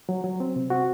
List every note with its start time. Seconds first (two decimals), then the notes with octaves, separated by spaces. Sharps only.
0.09 F#3
0.24 F#3
0.40 C4
0.56 C3
0.70 C4 F#4